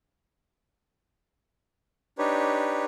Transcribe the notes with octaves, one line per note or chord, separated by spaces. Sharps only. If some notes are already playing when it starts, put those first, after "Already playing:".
D4 D#4 G4 B4 C#5